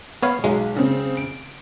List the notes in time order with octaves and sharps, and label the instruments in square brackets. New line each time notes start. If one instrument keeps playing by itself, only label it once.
[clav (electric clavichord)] B3 C#5 F5
[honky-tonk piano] B1 [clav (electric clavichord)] F#3 G#3
[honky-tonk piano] C#3 C4
D7